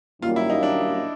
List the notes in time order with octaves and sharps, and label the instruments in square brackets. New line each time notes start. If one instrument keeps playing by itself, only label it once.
[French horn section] F#2 D#3 G3 A#3 [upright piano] F4
[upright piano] E4
D#4
D4